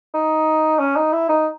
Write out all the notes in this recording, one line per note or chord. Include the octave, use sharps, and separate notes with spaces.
D#4
C#4
D#4
E4
D#4